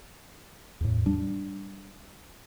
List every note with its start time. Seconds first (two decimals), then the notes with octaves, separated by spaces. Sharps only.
0.81 E2 A2
1.06 G3 D4